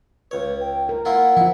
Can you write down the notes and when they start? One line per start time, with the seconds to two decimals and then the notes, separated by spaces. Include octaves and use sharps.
0.31 C#2 B4 C#5
0.60 G5
0.89 A#4
1.05 A#3 E4 F4 F#5
1.37 F3 E4 F4